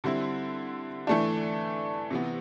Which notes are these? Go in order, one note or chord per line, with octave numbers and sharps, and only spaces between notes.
D3 G3 C4 E4
E3 A3 D4
C3 E3 B3